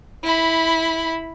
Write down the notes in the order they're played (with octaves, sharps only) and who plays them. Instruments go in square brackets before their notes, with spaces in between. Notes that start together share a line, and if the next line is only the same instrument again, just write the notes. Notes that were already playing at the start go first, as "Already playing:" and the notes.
[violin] E4 B5